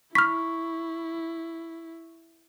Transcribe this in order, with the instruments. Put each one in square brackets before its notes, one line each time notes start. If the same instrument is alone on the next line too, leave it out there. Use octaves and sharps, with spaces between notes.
[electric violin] E4 [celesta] B5 C#6 [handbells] F6 B6